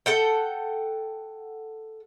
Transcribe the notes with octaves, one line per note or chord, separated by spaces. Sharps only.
A4 F#5 G5